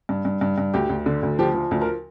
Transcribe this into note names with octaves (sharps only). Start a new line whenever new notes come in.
G2
G2
G2
G2
D2 G4
D2
D3
D2
F3 G4
F3
D2
A#4